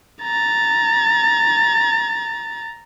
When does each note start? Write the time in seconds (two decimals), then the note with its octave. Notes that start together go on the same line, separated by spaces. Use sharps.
0.23 A#5 A6